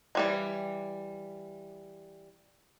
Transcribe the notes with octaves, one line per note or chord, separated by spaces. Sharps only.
E3 G3 G#3